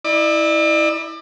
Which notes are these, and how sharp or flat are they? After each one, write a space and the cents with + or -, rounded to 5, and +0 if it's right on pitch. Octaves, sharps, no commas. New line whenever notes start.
E4 -15 D5 +35